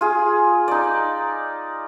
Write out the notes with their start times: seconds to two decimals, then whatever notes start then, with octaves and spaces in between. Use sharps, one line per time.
0.01 F4 G#4
0.68 D#4 D5